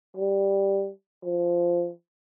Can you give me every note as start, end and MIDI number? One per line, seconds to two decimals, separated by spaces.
0.17 0.90 55
1.24 1.90 53